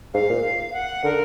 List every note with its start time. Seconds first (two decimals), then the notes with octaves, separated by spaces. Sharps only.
0.14 G#2 F5
0.29 A#2
0.73 F#5
1.04 D3 A#4